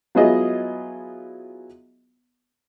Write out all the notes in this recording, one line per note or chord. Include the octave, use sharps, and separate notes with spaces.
F#3 B3 E4 F4 G#4 D#5